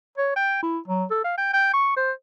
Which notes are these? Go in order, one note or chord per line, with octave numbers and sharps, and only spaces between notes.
C#5
G5
E4
F#3
A4
F5
G5
G5
C#6
C5